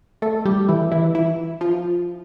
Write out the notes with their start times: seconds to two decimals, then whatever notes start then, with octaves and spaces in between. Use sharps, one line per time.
0.22 A3 A4
0.45 G3 G4
0.69 E3 E4
0.92 E3 E4
1.15 E3 E4
1.61 F3 F4